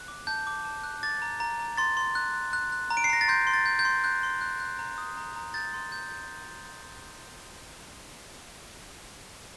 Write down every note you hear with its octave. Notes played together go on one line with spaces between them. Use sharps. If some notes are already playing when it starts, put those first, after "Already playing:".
Already playing: F#6
D6
A5 G6
D6
A5
F#6
D6 A6
A#5
A#5
A#5
C6 A6
C6
F#6
F#6
F#6
F#6
A#5
D7
C7
A#5 A#6
A6
C6 G6
C6
A6
G6
G6
C6
F#6 G6
C6
F#6
F#6
A#5
D#6
A#5
A#5
G6 A6
C6
G6
G6